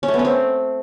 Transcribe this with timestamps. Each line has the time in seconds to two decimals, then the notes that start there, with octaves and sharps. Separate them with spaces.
0.03 C#4
0.08 A3
0.14 B3
0.19 C#4
0.25 C4